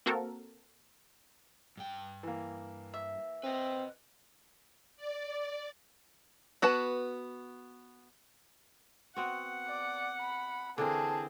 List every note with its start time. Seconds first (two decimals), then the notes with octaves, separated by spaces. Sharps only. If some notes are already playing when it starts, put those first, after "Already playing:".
0.06 A#3 C4 F#4 A4 A#4
1.77 G2 G5
2.23 E3 A#3
2.94 E5
3.44 C4 B4 D#5
4.96 D5
6.62 B3 F#4 B4 A5
9.16 B3 C4 F#4 F#5
9.67 D5
10.21 B5
10.78 D3 E3 C4 G#4 A#4 A5